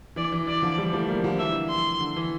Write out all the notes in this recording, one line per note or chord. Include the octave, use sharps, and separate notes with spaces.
E3 D5
E3
E3 D5
D3 F3
E3 G3
F3 A3
G3 A#3
D3 F3
E3 E5
C6
D3
E3